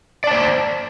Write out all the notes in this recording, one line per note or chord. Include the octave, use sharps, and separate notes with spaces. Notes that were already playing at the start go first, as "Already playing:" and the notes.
C5 D5 A5